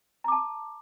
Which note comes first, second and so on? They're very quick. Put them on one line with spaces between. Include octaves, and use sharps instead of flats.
A#5 D6 A5